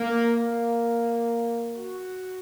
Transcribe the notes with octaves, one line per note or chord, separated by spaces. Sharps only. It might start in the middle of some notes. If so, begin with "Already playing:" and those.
Already playing: A#3
A#3
F#4